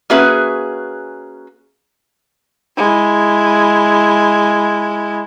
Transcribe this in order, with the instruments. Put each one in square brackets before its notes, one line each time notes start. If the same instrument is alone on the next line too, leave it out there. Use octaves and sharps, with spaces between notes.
[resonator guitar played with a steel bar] A#3 C#4 F#4 G#4 B4 E5
[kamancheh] G#3 E4